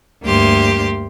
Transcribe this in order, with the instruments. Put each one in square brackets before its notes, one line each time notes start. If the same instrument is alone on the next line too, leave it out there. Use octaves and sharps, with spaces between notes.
[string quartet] D2 G2 A#3 G4 C6